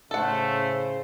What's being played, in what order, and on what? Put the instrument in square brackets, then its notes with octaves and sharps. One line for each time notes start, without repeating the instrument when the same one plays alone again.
[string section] A2 C5 [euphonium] C#3 [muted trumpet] A3 [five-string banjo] A4 F#5